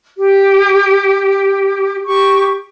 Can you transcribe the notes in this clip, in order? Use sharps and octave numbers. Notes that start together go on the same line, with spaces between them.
G4
G4 C#6